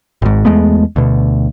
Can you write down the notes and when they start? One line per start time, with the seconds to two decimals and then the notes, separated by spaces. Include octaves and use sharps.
0.22 G#1 G#2
0.45 E2 G#3 A3 B3
0.96 D2 B2